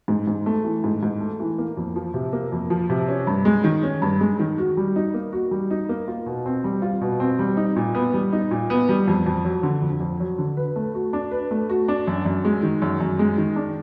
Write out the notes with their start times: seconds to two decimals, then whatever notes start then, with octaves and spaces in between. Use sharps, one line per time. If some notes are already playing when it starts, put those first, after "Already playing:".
0.08 G#2
0.27 G#2
0.46 A3
0.64 E3
0.84 G#2
1.03 G#2
1.21 A3
1.40 E3
1.58 A#3
1.77 F2
1.96 F3
2.14 C3
2.33 A#3
2.52 F2
2.70 F3
2.89 C3
3.09 C#4
3.27 G2
3.45 G#3
3.64 D#3
3.83 C#4
4.02 G2
4.20 G#3
4.39 D#3
4.58 F#4
4.77 G3
4.96 D#4
5.14 A#3
5.33 F#4
5.51 G3
5.71 D#4
5.89 A#3
6.08 F4
6.26 B2
6.46 C4
6.64 G3
6.82 F4
7.01 B2
7.20 C4
7.39 G3
7.57 D#4
7.76 A#2
7.95 B3
8.14 G3
8.33 D#4
8.51 A#2
8.70 B3
8.89 G3
9.08 F2
9.26 F2
9.45 F#3
9.63 D3
9.82 F2
10.00 F2
10.20 F#3
10.38 D3
10.57 B4
10.76 A3
10.94 F#4
11.13 D4
11.31 B4
11.51 A3
11.69 F#4
11.88 D4
12.07 F#2
12.25 F#2
12.45 G#3
12.63 D#3
12.82 F#2
13.00 F#2
13.19 G#3
13.38 D#3
13.56 D4